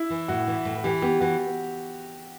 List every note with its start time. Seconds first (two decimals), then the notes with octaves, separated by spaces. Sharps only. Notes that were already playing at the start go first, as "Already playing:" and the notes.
Already playing: E4
0.10 E3
0.28 A2 F#4
0.47 E3
0.65 A2
0.84 E3 G4
1.02 B3 G4
1.21 E3 F#4